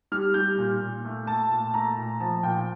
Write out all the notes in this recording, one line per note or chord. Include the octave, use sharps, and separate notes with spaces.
G3 F6
G3 G6
A#2
A#2
A3
A3 A5
A#2
A3 A#5
A#2
F3 A5
A#2 G5